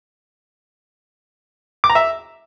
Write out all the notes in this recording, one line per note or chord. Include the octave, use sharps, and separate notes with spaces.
D6
A#5
E5